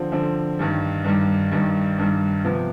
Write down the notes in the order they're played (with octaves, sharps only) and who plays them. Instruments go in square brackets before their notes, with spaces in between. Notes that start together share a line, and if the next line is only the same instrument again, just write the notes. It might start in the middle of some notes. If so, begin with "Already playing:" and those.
Already playing: [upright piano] D3 F3 C4
D3 F3 C4
G2 D#3 G3
G2 D#3 G3
G2 D#3 G3
G2 D#3 G3
C3 F3 B3